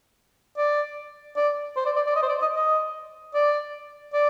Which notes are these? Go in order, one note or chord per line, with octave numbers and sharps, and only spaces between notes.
D5
D5
C5
D5
D5
D5
D#5
C5
D5
D#5
D#5
D5
D5